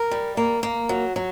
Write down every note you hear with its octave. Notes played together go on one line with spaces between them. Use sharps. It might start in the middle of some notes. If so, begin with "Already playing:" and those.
Already playing: A#4
G3
A#3
A#3
F#3
F#3